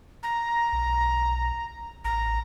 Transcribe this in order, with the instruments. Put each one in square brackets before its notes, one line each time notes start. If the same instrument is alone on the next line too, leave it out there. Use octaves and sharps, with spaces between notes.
[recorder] A#5
[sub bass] B1
[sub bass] A1 [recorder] A#5